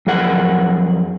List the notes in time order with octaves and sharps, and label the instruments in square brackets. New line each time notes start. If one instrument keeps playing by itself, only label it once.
[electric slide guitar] F2 F#3 G#4 A#4 F#5